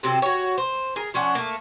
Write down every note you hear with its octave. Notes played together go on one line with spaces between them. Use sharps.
C3 F#3 C4 A4
F#4 C#5
C5
G#4 A#4
F3 C#4 D4 F#5
A3 A#3